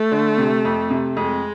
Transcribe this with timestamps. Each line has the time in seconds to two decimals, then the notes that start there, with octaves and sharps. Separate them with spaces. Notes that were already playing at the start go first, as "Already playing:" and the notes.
Already playing: A3
0.12 D3
0.38 C3
0.65 F2
0.91 C3
1.17 F2 G#3